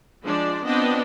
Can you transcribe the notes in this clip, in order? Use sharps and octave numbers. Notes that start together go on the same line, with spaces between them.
F3 G#3 D4 D5
B3 C4 D4 F4 D#5 G5